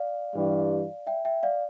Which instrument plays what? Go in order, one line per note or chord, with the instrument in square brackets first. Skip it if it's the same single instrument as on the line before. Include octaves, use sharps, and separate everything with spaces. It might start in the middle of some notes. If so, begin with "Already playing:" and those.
Already playing: [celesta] D5 F5
[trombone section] G2 E3 G3
[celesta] E5 G5
E5 G5
D5 F5